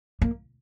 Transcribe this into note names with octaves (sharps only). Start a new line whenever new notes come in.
A#3